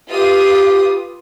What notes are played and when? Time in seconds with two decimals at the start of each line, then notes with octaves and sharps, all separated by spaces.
0.10 F4 G4 B4 D#6